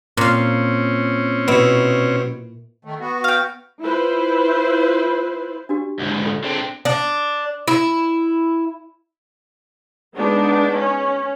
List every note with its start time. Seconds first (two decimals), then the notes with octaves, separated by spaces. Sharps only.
0.17 A#2 C4 C#4 F5
1.48 B2 E4
2.85 D#3 A3
3.00 B3 F#4
3.24 F5 G5
3.81 E4 F4 B4 C5
5.69 D4 F#4 G4
5.99 D2 G#2
6.22 F4 A4
6.44 D3 C4 G#4
6.85 D4
7.68 E4
10.16 G#3 B3 D4 D#4
10.75 C#4